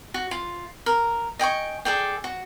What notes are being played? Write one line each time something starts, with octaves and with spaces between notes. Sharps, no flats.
F#4
F4
A#4
D#5 G5 G#5 C#6
G#4 A4 D5 G5
F#4